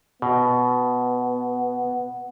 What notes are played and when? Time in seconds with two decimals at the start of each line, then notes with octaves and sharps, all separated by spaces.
0.22 B2 B3